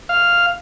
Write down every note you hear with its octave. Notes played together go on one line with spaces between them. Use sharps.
F5